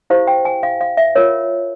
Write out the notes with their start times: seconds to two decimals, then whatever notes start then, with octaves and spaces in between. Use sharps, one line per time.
0.10 E4 G4 C5 F5
0.27 G5
0.45 G#5
0.63 F5
0.81 F5
0.97 E5
1.15 F4 A#4 C#5